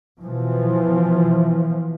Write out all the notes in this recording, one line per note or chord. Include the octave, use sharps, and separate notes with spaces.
B2 E3 F3